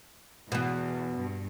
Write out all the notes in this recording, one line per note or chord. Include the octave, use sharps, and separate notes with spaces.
E2 B2 B3
G2